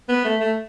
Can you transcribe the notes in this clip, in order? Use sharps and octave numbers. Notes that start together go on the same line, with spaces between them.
B3
A3
A3